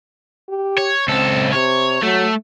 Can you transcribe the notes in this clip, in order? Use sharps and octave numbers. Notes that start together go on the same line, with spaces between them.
G4
C#5
C#2 C4 A4
C3 C#5
F#3 A3